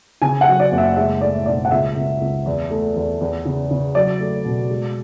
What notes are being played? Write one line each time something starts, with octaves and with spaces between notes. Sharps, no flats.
C#3 G#5
F#5
F#3
D5
F#1
E5
G#3 E5
A2 D5
B1 D5
F#5
C#2 E5
C#2
C#2
E2
A3
E2
E2
C#3
C#3
F#3 D5
A3
B2
G#3